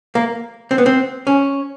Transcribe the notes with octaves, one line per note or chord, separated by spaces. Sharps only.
A#3
C4
B3
C4
C#4